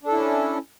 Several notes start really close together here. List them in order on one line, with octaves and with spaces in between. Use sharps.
D4 A4 E4 C#4